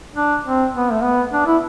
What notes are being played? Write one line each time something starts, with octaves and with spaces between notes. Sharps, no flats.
D4
C4
B3
A3
B3
D4
E4